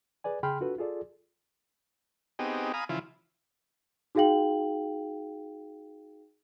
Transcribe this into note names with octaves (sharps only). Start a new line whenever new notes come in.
G#4 B4 D5 G#5
C#3 G#4 G5 B5 C6 F6
D4 F4 F#4 A4 B4
F4 G#4 A4 D5
B3 C4 D#4 G4 G#4
F5 G#5 A#5 B5 D#6
C#3 E3 F3 E4 F4
D#4 F#4 G#4 F5 G5 F#7